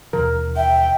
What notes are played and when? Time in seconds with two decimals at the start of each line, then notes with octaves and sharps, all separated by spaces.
0.13 D#2 B2 E3 A#4
0.56 E5 G5